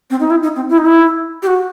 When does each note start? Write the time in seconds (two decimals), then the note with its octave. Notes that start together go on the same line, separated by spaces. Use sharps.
0.10 C4
0.20 D#4
0.30 E4
0.43 D#4
0.56 C4
0.70 E4
0.78 D#4
0.86 E4
1.43 G4
1.47 F#4